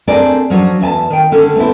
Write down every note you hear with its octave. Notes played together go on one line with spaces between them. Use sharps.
A3 C4 D4 G#4 A#4 D5
F3 F#3 C#4 D4
E2 E5 G#5 A5
D#3 G5
D3 C#4 A4
A3 B3 C4 E4